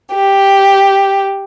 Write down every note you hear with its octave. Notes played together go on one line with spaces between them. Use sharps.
G4